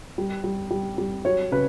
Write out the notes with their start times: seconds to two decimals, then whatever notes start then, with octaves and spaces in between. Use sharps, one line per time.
0.18 G3
0.44 G3
0.71 G3
0.98 G3
1.25 F#3 C#5
1.51 C#3 B4